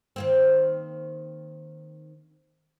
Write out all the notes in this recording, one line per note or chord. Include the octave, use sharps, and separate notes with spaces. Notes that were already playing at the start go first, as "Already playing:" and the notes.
D#3 A#3 C4